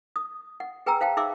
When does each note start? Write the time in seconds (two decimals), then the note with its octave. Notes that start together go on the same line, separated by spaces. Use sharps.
0.16 D#6
0.60 F#5
0.86 G#4 B4 G5 G#5 A#5 E6
1.01 C5 F5 G5 A5
1.17 D#4 G#4 E5 C6 D6 E6